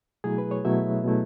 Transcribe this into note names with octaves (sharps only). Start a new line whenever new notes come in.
B2 F#3 A3 E4 G#4
B4
C#5
B2 F#3 A3 E4 E5
B2 F#3 A3 E4